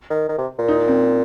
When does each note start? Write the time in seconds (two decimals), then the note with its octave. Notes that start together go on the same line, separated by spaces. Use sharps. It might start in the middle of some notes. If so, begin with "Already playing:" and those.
0.10 D#3
0.29 D#3
0.38 C3
0.59 A#2
0.68 D#4
0.88 C4